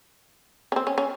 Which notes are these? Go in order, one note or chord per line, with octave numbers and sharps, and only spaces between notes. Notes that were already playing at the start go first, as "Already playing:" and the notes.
C#4
C4
C#4
C#4